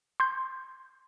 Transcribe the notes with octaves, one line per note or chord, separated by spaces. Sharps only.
C6 G6